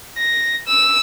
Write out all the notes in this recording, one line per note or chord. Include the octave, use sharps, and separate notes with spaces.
A#6
E6